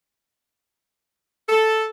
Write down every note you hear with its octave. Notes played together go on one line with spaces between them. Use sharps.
A4